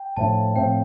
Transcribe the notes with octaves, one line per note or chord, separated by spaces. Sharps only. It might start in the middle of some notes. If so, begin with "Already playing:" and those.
Already playing: G5
A2 F3 A3 D4 A5
A2 F3 A3 C4 G5